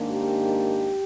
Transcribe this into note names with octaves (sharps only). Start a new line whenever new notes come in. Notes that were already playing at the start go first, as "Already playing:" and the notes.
Already playing: G#2 D#3 A#3 D4
G4